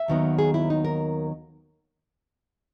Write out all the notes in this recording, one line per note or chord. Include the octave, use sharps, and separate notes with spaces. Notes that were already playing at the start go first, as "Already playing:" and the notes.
Already playing: E5
D#2 D#3 F#3 B3
G#4
E4
D#4
A#4